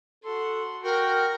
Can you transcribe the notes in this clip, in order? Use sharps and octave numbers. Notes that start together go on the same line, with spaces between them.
F#4 A4 C6
F#4 A#4 G5